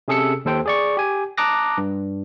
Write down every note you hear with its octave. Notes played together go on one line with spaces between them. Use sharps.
C3 C#4 G#4 A4 E6 C#7
D#2 A4 C5 G5
G#4 D5 C#6
G4 G#5
A5 A#5 D6 D#6 F#6 A#6
G2